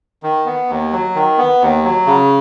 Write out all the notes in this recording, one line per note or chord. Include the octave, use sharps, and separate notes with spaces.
D#3
B3
D#2
F#3
D#3
B3
D#2
F#3
C#3